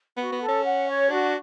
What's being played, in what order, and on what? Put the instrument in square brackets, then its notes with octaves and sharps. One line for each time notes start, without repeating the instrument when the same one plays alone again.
[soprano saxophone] B3 [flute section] F#4
[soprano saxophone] B3
[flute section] A4
[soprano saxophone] C#4
[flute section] F#5
C#5
[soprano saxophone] D4 [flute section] F#4